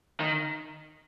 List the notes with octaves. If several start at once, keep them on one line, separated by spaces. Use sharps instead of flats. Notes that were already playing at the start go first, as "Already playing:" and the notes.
D#3